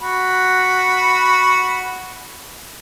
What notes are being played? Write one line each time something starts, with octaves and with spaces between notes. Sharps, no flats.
F#4 B5